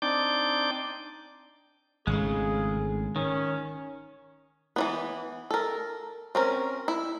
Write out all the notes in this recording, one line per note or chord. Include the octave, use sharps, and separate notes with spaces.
C4 D4 D#4 D5 D6 G6
G#1 A2 C#3 G#3 G#4
D#3 C#4
E3 F#3 B3
A4 A#4
C4 C#4 A#4
E4